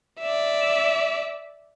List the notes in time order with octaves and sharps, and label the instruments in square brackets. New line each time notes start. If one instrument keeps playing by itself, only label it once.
[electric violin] D5 E5